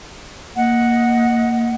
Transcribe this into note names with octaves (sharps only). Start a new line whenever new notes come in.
A#3 D#5 F#5